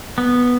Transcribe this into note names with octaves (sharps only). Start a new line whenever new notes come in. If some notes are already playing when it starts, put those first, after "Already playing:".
B3